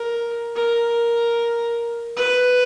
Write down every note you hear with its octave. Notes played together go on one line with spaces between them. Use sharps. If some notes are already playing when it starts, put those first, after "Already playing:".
Already playing: A#4
A#4
B4